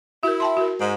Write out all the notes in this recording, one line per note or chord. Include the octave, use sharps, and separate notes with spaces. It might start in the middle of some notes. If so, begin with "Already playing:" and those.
E4 F#4 A#4
G5 A5 C6
F#4 A#4
G#2